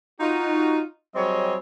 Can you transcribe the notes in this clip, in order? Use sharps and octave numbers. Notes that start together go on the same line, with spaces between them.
D#4 F4 F#4
F#3 G3 C4 G#4 C#5 D#5